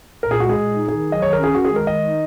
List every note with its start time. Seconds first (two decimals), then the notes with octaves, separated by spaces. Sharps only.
0.23 A#2 A#4
0.31 G#4
0.39 G#3 F#4
0.49 G#4
0.55 A#2
0.73 D#4
0.88 D#3 G#4
1.05 F#3
1.12 D#5
1.22 D#3 C#5
1.33 C#4 A#4
1.44 G#4
1.54 D#3 F#4
1.65 G#4
1.70 G#3
1.76 A#4
1.87 D#3 D#5
2.03 D#4